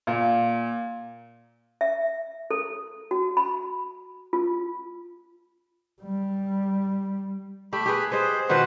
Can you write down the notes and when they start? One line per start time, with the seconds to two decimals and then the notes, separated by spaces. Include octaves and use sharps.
0.07 A#2
1.81 E5
2.51 A4
3.11 F#4
3.37 B5
4.33 F4
6.02 G3
7.73 A3 G4 B5
7.86 G4 G#4 B4
8.12 G#4 B4 C5 D#5
8.49 B2 D#3 F3 B4 C5 F#5